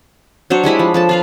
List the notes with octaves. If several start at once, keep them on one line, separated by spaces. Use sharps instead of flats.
F#3 D4 C5 C#5
G3 G#3 E4 B5
F3
F3 A4 A5
F4 B4 F5